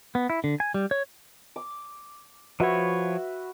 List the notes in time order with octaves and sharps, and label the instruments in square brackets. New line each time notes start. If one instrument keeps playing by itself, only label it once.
[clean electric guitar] B3
E4
D3
G#5
G3
C#5
[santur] D6
[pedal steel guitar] F3 C#5 [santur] F#4 B4 E5